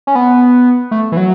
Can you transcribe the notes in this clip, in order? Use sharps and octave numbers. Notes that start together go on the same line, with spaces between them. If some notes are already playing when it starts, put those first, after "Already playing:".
C#4
B3
A3
E3
F#3